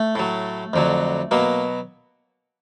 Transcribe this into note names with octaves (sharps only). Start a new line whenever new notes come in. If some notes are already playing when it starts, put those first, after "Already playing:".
Already playing: A3
A2 F#3
F2 D3 F#3
B2 F#3 A#3